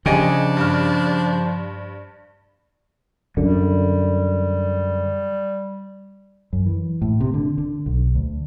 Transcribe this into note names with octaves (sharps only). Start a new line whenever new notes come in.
C#3 F3 D4 G4 G#4 D#5
G2 F6
F#2 D3 G3
F#2
E3
A2
C3
D3
D3
B1
D2